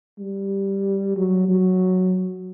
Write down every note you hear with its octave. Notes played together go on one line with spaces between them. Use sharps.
G3
F#3
F#3